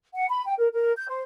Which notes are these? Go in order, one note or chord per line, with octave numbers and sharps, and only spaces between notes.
F#5
B5
G5
A#4
A#4
G6
C5